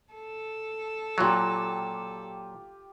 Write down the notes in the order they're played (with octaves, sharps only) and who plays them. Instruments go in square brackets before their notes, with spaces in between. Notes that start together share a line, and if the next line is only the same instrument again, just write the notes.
[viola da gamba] A4
[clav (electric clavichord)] A#2 F#3 [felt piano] F4 G4